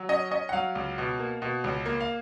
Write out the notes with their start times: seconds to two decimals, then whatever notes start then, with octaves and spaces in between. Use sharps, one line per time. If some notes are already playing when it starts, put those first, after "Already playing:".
Already playing: F#3
0.09 C#4 D#5
0.31 C#4 D#5
0.49 F#5
0.53 F#3 F5
0.75 C#2
0.98 B2
1.19 A#3
1.42 B2
1.64 C#2
1.86 A#3
2.00 F5